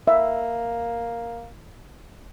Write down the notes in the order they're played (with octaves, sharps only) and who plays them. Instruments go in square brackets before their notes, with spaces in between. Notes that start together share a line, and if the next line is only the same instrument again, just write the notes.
[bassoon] A#3 [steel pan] E5